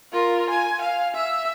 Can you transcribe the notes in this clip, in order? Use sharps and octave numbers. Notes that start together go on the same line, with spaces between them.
F4 A#4
G#5
F5
E5 E6